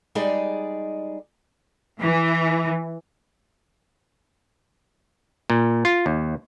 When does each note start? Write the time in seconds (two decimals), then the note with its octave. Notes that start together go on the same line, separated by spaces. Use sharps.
0.15 G3 G#3 D#4 G#4 D5
2.00 E3
5.50 A#2
5.85 F4
6.06 D#2